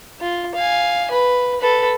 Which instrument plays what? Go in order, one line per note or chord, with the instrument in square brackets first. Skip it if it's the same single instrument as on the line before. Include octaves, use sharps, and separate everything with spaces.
[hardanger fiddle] F4
F5 G#5
B4
A4 B4